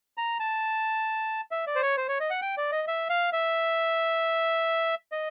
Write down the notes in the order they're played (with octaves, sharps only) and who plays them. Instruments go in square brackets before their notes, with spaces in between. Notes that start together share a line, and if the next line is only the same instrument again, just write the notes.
[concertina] A#5
A5
E5
D5
C5
C#5
C5
C#5
D#5
F#5
G5
D5
D#5
E5
F5
E5
D#5